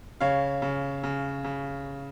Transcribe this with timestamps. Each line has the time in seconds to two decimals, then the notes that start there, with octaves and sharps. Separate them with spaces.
0.21 C#3 C#5 F5
0.62 C#3
1.03 C#3
1.44 C#3